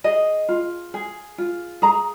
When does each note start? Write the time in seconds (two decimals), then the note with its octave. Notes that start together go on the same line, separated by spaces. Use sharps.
0.04 G#4 D#5
0.49 F4
0.94 G#4
1.38 F4
1.82 G#4 A#5